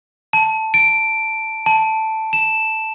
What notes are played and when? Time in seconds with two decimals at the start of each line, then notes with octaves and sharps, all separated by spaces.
0.33 A5
0.74 D7
1.66 A5
2.33 E7